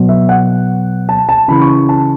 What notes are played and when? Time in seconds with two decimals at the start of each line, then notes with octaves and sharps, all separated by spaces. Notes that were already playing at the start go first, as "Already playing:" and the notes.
Already playing: B2 F#3
0.09 E5
0.29 F#5
1.09 A5
1.29 A5
1.48 C#3 E3 B5
1.62 C#6
1.89 A5